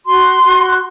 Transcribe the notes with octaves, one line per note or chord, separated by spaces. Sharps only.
F#4 C6
F#4